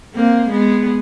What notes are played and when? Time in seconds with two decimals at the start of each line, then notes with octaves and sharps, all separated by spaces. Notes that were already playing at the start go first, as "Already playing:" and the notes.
0.14 A#3 C4
0.49 G#3 B3